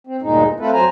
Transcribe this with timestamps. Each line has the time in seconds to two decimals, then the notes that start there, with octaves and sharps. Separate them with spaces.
0.07 C4
0.22 D2 G2 A#2 G#3 D#4
0.46 E2
0.60 A3 C4 F4 A4 B4
0.73 F2 F#3 C5 G#5 A#5